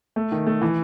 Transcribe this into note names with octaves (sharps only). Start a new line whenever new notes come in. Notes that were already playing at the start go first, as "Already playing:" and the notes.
A3
D#3
A3
E3